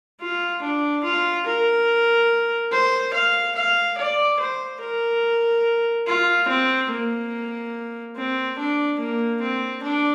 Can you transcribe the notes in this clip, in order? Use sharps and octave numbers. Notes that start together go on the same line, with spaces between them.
F4
D4
F4
A#4
C5
F5
F5
D5
C5
A#4
F4
C4
A#3
C4
D4
A#3
C4
D4